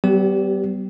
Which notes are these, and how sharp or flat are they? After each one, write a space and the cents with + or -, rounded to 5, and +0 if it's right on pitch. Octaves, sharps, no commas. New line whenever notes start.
G3 -40 B3 +20 G4 -5